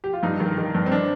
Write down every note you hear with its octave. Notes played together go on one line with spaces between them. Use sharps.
G4
F4
G2 D#4
D#3
D#3
G2
C4
D4